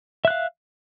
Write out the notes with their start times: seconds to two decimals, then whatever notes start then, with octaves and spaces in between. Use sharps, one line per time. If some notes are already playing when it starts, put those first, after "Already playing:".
0.25 E5
0.28 F#6
0.30 F5